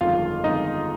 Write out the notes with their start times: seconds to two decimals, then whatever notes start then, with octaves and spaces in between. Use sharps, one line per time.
0.01 G1 F2 D#3 G#3 F4 F5
0.44 G1 F2 D#3 G#3 D#4 D#5